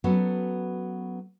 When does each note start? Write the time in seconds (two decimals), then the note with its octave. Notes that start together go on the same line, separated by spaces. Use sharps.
0.04 F#3 B3 C#4 F#4 A4 B4